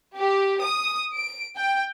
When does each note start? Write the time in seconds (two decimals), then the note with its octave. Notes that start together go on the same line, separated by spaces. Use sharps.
0.17 G4
0.66 D#6
1.15 D7
1.57 G5